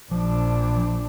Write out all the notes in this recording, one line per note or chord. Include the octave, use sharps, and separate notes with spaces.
A#1 F3 D4